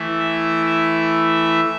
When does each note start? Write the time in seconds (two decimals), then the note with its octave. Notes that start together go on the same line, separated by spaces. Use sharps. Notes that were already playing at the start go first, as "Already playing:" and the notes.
Already playing: E3 A3 E4
0.19 E5
0.66 E5